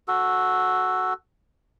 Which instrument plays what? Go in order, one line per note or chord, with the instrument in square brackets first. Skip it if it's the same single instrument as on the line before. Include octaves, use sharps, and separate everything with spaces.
[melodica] F#4 A4